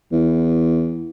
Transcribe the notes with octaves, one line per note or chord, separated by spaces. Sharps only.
E2